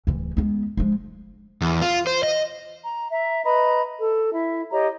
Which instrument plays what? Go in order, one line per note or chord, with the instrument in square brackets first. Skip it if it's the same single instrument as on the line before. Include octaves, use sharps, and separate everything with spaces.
[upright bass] D1 E3
G#3 B3
F3 G#3
[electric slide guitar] E2
F4
C5
D#5
[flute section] A#5
E5 A#5
B4 D#5 A#5 B5
A4
E4 E5
G4 C#5 D#5 A#5